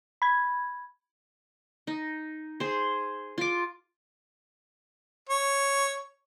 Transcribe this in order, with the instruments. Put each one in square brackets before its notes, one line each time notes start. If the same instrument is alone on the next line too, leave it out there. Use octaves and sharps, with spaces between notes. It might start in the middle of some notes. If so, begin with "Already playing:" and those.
[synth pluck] B5 G#6
[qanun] D#4
G#4 C5
F4 D6
[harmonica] C#5